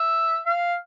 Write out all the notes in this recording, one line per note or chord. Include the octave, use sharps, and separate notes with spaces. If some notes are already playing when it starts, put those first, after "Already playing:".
Already playing: E5
F5